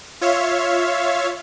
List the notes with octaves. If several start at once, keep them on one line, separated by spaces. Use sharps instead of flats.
F4 C#5 E5 F5